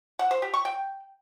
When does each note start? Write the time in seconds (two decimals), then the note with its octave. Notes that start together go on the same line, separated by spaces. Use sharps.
0.19 F#5
0.31 C5
0.42 G4
0.54 C#6
0.65 G5